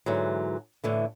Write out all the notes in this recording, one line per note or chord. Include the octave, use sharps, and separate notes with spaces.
G#2 D3 E3 F#3
A2 D3 E3